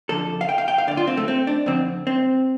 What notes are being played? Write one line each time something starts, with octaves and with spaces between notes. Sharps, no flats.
F2 D3 A4
F5
G5
F5
G5
F5
D2 D3 D5
F4
C4
A3
C4
D4
F2 D3 C4
C4